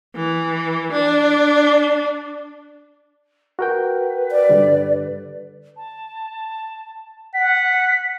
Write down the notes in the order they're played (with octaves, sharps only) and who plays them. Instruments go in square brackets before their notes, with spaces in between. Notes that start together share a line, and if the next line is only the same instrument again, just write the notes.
[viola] E3
D4
[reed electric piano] F#4 A#4 G5 [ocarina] B4
[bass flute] D5
[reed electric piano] G2 D3 G3
[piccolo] A5
[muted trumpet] F#5 [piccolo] B6